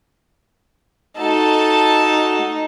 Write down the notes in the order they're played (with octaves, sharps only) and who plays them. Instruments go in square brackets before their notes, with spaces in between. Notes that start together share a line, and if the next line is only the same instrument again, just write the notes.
[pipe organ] A3 F#4 [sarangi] D#4 [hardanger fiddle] A4 A5